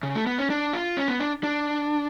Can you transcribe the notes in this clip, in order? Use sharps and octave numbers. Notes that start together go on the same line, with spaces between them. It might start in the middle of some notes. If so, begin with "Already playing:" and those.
C#3
A3
B3
C#4
D4
F4
C#4
B3
D4
D4